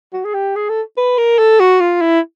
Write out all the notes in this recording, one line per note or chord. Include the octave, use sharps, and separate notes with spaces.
F#4
G#4
G4
G#4
A4
B4
A#4
A4
F#4
F4
E4